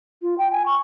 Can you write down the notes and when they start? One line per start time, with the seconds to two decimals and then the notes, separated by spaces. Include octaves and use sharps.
0.22 F4
0.38 G5
0.52 G#5
0.66 C#6